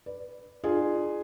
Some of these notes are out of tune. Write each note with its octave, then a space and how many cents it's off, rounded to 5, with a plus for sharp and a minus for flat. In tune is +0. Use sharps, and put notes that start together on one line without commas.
B4 +0 D5 +0
D4 +40 F4 -5 G#4 +0